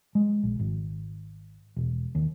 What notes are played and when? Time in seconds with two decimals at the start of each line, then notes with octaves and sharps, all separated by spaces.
0.15 G#3
0.43 A#1
0.59 G#1
1.77 E1
2.15 D#2